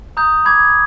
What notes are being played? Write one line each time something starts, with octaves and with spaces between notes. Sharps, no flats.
A#5 D#6 G6
B5 D6 G6 G#6